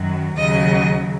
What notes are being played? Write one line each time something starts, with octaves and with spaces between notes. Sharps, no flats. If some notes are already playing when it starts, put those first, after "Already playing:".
Already playing: F#2 D#3 F#3
D#2 C#3 F#3 D#5